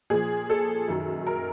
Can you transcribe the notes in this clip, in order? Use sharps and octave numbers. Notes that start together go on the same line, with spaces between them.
A#2 F3 G#4
A4
F#2 D#3 F#3
A#4